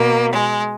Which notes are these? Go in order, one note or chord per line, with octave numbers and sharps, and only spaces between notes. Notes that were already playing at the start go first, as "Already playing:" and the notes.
Already playing: B2 A#3
G#3